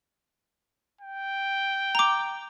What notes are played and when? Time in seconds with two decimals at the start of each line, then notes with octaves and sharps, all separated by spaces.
1.01 G5
1.95 A#5 D6